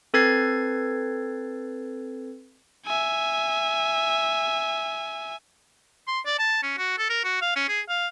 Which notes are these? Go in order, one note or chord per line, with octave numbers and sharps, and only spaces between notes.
C4 A4 B4 G#6 A6 C7
E5 G#5
C6
D5
A5
C#4
F#4
A4
A#4
F#4
F5
C#4
G#4
F5